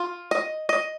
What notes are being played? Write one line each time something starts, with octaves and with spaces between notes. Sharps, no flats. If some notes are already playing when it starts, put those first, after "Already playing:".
Already playing: F4
D#5
D#5